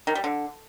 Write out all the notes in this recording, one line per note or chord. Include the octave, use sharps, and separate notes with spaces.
D#3
G3
D3